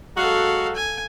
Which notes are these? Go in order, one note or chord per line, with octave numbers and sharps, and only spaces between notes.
F#3 G#3 F#4 A4 F5
G#5